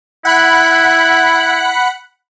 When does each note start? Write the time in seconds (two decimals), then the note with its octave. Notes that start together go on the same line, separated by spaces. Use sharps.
0.25 E4 F#5 B5 F#6